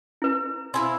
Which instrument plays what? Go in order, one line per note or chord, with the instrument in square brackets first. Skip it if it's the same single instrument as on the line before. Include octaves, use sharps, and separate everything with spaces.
[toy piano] E4 B4
[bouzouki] C4 E4 F5 [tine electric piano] G#5 C6